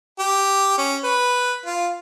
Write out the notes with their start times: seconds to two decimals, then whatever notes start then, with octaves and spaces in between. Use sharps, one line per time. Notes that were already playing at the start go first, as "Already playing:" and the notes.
0.19 G4
0.78 C#4
1.04 B4
1.66 F4